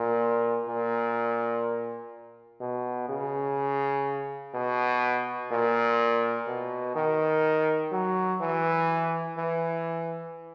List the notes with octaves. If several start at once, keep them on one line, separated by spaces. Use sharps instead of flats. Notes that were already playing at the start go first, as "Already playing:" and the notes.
Already playing: A#2
A#2
B2
C#3
B2
A#2
B2
D#3
F#3
E3
E3